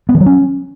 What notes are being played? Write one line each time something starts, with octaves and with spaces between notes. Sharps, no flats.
B3
E3
F#3
C#4